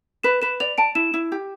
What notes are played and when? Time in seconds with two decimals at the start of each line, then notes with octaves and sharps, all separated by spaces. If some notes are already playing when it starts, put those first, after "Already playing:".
0.23 B4 E7
0.42 B4 E7
0.60 D5 F7
0.78 A5 D7
0.95 E4 E7
1.14 E4
1.32 G4